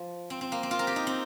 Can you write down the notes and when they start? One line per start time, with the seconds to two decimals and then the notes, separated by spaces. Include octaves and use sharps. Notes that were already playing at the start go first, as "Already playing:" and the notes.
Already playing: F3
0.30 C4
0.41 C4
0.52 A#3
0.63 C4
0.71 F4
0.79 A#4
0.87 G4
0.96 D#4
1.07 C4